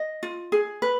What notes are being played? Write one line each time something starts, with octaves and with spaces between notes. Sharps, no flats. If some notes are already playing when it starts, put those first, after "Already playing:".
Already playing: D#5
F4
G#4
B4